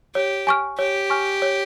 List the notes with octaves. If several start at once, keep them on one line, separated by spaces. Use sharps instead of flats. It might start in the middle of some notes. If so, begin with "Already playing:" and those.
G4 C#5
G#5 C#6 F6
G4 C#5
G#5 C#6 F6
C#5